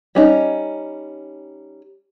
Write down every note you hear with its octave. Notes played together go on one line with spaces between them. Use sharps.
G3 C#4 D#4